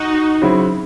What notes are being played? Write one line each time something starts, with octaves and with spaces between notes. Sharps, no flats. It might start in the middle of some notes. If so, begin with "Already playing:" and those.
Already playing: D#4 F#4
C#3 F#3 C4 E4